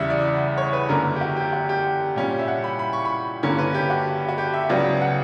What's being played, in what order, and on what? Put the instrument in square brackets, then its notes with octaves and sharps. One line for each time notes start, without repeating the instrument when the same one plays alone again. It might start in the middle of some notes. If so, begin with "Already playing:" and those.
Already playing: [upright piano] E2 C#3 G3 E5 F#5
D5
C#5
B4
F#2 D3 A#3 A#4
G4
F#4
G4
F#4
G4
A#2 G3 C#4
E5
F#5
B5
B5
C#6
B5
G2 D3 A#3 C#4
B4
G4
F#4
F#4
G4
E5
C#2 C#3 F#3 B3 D5
F#5